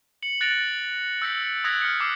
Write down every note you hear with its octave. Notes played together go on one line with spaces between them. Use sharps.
C#7 F#7
F#6 A6 A#6 D7 F7
E6 G6 A#6 B6 C#7
D#6 E6 F#6 G#6 A#6 B6
F6 C#7
D6 E6 F#6 C7